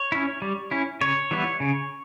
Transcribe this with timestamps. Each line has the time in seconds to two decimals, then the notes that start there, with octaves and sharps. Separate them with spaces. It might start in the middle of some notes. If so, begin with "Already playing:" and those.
Already playing: C#5
0.12 C#4 E4
0.42 G3
0.71 C#4 E4
1.01 C#3 C#5
1.31 E3 G3 B3 E4
1.60 C#3